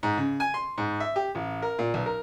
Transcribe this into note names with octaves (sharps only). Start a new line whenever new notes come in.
G#2
C#3
G#5
C6
G#2
E5
G4
A1
A#4
A#2
B1
A#4